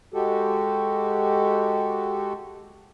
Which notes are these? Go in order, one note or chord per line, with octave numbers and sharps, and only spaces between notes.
G#3 F#4 G4 A4